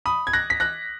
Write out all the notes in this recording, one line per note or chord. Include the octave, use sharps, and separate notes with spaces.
B5 D#6
G#6
F#6 A#6
B6
F#6 A#6